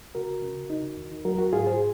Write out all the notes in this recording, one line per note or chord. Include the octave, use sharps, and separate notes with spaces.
C#3 F#4 A#4
C#3
D#4
D#2
F#3 F#4 A#4
F#4
G#2 F4 G#4
G#4 C5